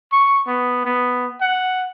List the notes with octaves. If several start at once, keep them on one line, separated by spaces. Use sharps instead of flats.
C#6
B3
B3
F#5